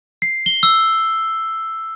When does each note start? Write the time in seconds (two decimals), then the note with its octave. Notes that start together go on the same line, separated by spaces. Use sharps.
0.22 C7
0.46 G7
0.63 E6